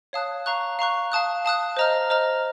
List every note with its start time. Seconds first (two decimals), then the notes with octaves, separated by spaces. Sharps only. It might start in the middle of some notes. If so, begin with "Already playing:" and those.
0.13 C#5 F5 A5 D#6 F#6
0.46 F5 A#5 C#6 F#6
0.79 F5 A#5 C#6 F#6
1.12 F5 A5 D#6 F#6
1.45 F5 A5 D#6 F#6
1.77 C5 D#5 A#5 F6
2.10 C5 D#5 A#5 F6